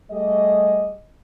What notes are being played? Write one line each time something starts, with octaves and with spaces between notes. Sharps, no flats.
G3 A3 G4 G#4 D#5